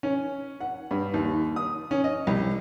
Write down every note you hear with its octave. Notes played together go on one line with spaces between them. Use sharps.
C#4
F#5
G2
D#2
D#6
C#4
D#5
C2